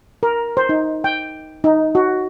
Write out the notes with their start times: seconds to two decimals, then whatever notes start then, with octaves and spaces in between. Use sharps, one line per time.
0.23 A#4
0.57 C5
0.69 D#4
1.04 G5
1.64 D#4
1.95 F#4